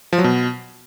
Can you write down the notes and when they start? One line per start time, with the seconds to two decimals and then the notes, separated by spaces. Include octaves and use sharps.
0.13 F3
0.18 F#3
0.24 B2